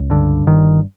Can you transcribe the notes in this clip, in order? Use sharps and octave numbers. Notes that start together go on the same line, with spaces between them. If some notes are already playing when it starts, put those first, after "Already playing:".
Already playing: C#2
G2 D3
G1 D#3